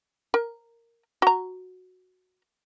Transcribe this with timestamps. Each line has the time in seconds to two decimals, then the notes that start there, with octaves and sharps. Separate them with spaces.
0.34 A#4
1.22 F#4 A#5